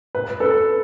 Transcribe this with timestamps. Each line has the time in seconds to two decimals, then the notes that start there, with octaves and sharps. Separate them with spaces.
0.15 B4
0.40 A4 B4